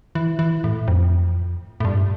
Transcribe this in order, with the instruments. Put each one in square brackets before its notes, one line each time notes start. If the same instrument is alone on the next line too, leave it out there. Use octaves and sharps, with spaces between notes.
[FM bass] E3
E3
A2
F2
A2
G2